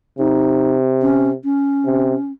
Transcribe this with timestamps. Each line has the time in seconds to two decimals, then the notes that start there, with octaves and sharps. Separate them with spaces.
0.19 C3 D#4
1.02 C#4
1.44 C#4
1.85 C3